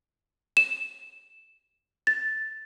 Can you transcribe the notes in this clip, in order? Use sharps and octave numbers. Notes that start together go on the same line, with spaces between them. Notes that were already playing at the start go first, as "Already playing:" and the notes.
E7
A6